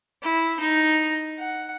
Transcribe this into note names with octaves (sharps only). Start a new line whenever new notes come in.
E4
D#4
F#5